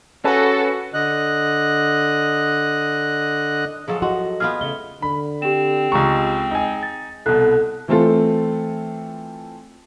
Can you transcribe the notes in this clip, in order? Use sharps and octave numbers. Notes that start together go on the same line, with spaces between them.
C#4 F#4 G#4 A4 B4 F#5
D3 D#5 F#6
F3 F#3 G#4 A4
F#4 D#5 C6
B3 F4 G#4 F6
C#3 A3 G7
D3 B5
C4 G4 E7
C#2 G#3 A#5 C#6
D#4 G#5
A6
C2 B2 A4 F#6
E3 A3 C4 F4 A4